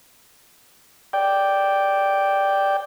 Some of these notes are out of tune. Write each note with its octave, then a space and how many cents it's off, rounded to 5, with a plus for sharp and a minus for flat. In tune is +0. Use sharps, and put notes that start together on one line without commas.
D5 +0 G5 +0